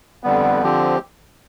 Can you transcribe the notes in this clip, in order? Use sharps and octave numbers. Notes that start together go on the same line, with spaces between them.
F2 D3 G3 B3
D3 F3 C4 G4